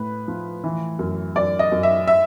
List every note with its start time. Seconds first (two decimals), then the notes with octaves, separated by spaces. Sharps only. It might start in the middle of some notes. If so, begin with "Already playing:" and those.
Already playing: A2 B4
0.28 F3
0.64 E3
0.99 F#2
1.35 F#2 D5
1.59 D#5
1.72 F#2
1.83 E5
2.07 E5